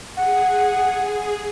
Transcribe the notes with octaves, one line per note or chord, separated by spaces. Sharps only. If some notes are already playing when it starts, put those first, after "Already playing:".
G#4 F#5